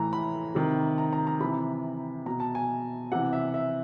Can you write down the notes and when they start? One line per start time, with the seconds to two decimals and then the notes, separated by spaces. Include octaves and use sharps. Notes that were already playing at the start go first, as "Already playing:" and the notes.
Already playing: A2 E3 A#5
0.13 B5
0.55 C3 D#3
0.98 A#5
1.13 A#5
1.27 A#5
1.40 C3 E3 B5
2.26 B2 A#5
2.40 A5
2.55 G#5
3.12 C3 E3 F#5
3.33 E5
3.54 E5